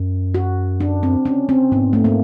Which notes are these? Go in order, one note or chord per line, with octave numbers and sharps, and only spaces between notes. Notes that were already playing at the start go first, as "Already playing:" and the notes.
Already playing: F#2
F#4
D4
C4
C#4
C4
G#2 B3
A3
A#3